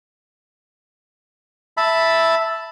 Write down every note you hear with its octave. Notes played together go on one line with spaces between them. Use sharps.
E5 A5 B5